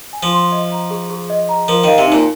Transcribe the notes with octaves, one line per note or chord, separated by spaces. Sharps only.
G#5
F3
C6
D#5
A#5
G#4
G#4
D#5
A#5
F3 A#4
D#3 F5
C3
A#2 D#4